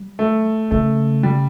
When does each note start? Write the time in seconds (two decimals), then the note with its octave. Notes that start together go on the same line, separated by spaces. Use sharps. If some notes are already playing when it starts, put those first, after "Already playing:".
Already playing: G3
0.19 A3
0.71 C#3 A3
1.23 G3